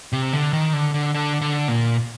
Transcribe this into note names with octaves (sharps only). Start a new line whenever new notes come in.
C3
D3
D#3
D3
D3
D3
D3
A#2